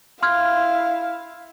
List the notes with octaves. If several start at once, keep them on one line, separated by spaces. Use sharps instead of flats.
E4 F5 C6 F6 G#6